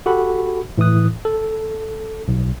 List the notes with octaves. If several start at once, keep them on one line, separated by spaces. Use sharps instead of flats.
F#4 G4 A4 F#5 B5
A2 E3 E4 D#6 F#6
A4
B1